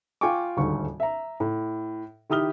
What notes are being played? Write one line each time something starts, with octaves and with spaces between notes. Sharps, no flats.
F4 G5 G#5 C#6 D6
D#1 D2 G#2 C#6
E5 A#5
A2
D#3 E4 G4 D#6 F6 G7